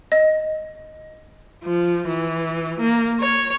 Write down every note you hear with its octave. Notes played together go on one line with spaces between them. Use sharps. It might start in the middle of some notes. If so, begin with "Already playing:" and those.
D#5
F3
E3
A#3
C#5